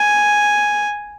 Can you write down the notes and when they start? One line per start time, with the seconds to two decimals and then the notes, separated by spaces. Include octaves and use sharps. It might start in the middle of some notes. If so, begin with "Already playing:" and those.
Already playing: G#5